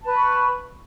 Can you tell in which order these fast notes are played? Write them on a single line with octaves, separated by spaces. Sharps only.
A5 B4 B5 C#6